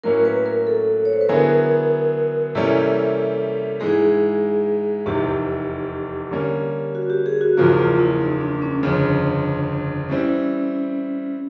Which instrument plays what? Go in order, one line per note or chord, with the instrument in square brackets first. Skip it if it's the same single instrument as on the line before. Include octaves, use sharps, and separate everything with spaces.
[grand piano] A2 F#3 A#3 C#4 [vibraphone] A#4
[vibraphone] B4
A#4
A4
C#5
C5
B4
[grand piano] D3 F#3 B3 E4 G#4 [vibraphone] A#4
[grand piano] C3 E3 G3 A#3 C#4 [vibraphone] A4
[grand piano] G#2 E3 G#3 [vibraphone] G#4
[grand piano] F1 E2 C3 D#3 [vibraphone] G4
[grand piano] D3 G3 A#3 C#4
[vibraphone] F#4
G4
G#4
F#4
[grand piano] F#1 E2 C#3 F3 A#3 [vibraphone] F4
[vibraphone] F4
E4
D#4
D4
C#4
[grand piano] G1 F2 C#3 [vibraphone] D4
[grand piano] E3 G3 C4 [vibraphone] C#4